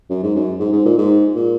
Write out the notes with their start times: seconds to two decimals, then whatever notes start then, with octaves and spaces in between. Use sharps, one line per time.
0.10 F#2
0.23 G#2
0.35 F#2
0.60 G#2
0.73 G#2
0.86 A#2
0.98 G#2
1.35 A#2